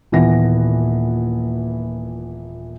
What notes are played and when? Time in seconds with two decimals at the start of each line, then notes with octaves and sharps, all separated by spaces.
0.12 D#1 A#2 E3 B3 A#6